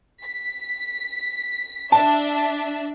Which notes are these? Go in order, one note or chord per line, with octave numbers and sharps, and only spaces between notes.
B6
D4 E5 A5